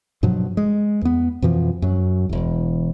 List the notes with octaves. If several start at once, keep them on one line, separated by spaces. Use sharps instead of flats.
G2 B2 F3 F#3
G#3
E2 B3
F2 B2 E3 F3
F#2 F#3
E1 E2